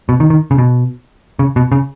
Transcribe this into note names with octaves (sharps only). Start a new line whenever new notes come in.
B2
D#3
D#3
C#3
B2
C#3
B2
C#3